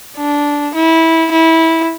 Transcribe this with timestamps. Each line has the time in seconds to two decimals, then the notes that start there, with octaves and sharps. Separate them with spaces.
0.18 D4
0.75 E4
1.32 E4